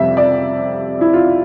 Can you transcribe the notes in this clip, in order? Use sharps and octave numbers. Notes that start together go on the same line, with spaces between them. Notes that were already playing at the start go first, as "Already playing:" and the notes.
Already playing: F2 C3 G3 E5
D5
E4
F4